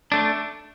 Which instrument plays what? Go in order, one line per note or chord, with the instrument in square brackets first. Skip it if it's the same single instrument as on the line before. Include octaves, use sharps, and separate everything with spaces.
[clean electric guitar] A3 D4